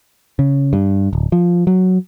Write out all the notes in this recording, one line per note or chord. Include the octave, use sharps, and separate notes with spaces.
C#3
G2
D1
F3
F#3